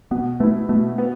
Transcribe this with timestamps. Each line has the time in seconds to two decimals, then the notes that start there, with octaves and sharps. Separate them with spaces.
0.11 B2 B3
0.40 A3 B3 E4
0.69 B2 A3
0.98 B3